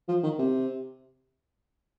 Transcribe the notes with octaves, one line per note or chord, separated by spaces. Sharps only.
F3
D#3
C3